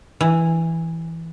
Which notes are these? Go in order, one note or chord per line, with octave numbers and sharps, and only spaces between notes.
E3